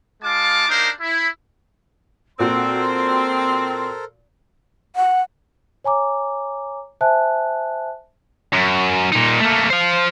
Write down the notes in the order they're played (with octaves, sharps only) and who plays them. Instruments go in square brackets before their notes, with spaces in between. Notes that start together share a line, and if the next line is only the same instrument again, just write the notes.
[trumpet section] G#3 F4 F5 A5 D6
A#3 D4 D#4 A#4 C5
E4
[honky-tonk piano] A#2 F#4 [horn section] C4 [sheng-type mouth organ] A4 A#4 C5 [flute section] C6
[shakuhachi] F#5
[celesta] C#5 G#5 A#5 D6
C5 E5 G#5 A5 F#6
[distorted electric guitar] F#2
A#2 D#4
A3 A#3
C5 F5